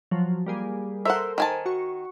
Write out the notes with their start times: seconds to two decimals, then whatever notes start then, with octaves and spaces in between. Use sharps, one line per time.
0.11 F3 F#3
0.46 G3 A#3 G#4
1.05 A4 A#4 C5 E5 F#5
1.38 D#3 G#5 A5
1.66 F#4 C#6